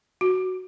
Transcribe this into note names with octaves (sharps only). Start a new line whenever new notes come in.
F#4